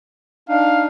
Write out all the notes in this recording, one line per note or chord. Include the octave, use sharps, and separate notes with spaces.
D4 D#4 F5